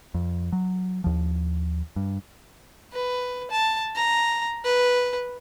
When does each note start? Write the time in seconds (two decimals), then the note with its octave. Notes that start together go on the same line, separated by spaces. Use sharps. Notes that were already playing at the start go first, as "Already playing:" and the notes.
0.14 F2
0.52 F#3
1.04 D#2 F3
1.96 G2
2.93 B4
3.51 A5
3.96 A#5
4.65 B4